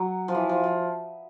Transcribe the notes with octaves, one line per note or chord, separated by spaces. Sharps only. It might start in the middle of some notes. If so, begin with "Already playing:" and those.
Already playing: F#3
F3
E3
F3
F3